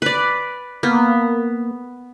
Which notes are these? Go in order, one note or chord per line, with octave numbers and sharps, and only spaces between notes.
B4 D5
A#3 B3